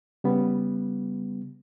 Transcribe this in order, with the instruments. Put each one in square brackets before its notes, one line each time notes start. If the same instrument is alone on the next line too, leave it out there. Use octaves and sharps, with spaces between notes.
[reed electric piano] C#3 G3 B3